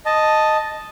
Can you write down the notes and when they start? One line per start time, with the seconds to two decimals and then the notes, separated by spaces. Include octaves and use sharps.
0.06 D#5 A5